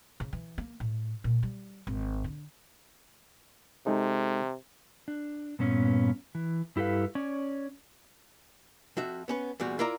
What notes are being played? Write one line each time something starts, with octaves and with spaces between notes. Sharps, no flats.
C#3
E3
A#3
A2
A#2
G3
G#1
D3
C3 G#3 D#4 A4
D4
G2 A#2 B3 C#4
E3
G2 E4 G4 A4 B4 F5
C#4 C#5 D5
F2 F#4 E5
B3 C#4 B4
E2 A#2 G3 F#4
E4 F4 A#4 D5 E5 A#5